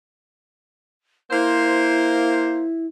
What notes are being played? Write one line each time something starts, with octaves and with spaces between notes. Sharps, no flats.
A#3 E4 C5